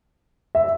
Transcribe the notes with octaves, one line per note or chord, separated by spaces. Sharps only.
E5